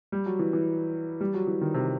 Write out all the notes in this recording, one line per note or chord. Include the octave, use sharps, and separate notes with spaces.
G3
F#3
E3
E3
G3
F#3
E3
D#3
C3